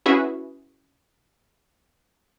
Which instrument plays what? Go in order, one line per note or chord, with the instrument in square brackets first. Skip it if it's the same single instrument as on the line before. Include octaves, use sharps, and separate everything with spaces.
[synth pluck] C#4 E4 F#4 G#4 B4 E5